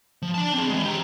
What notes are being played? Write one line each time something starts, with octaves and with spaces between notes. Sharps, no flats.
F3
D4 A5
C4 G#4
E3 G#3
G4 A#5